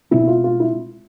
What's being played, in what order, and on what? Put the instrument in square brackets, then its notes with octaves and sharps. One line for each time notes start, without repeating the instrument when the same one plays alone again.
[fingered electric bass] B2 G#3 C4 [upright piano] E4
[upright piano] F4
F4
E4